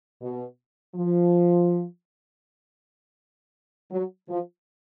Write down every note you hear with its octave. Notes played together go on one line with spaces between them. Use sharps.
B2
F3
F#3
F3